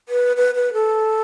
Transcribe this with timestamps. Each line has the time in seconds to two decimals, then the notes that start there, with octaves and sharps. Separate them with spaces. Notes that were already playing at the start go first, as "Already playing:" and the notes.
0.09 B4
0.36 B4
0.55 B4
0.73 A4